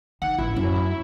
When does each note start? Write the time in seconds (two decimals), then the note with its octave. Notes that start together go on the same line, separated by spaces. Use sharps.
0.22 D#3 F#5
0.39 A1 E4
0.56 F#2